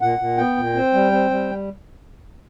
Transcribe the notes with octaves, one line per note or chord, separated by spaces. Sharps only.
A#2 F#5
A#2
B3 G5
A#2
C4
G3
C4
G3